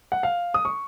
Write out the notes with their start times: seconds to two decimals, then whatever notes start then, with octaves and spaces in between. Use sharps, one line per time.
0.12 F#5
0.23 F5
0.54 D#6
0.65 C#6